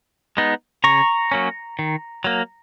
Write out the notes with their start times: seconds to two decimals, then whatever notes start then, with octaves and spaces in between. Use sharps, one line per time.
0.37 G#3 B3 D#4
0.84 C#3 A#5 C#6
1.32 F#3 A#3 C#4
1.79 D#3
2.24 F#3 A#3